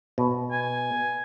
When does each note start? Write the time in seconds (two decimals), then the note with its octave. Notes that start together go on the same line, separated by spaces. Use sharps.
0.18 B2
0.52 G#5